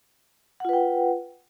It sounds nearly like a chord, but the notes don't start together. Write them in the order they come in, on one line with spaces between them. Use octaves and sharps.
F#5 F4 B4 G5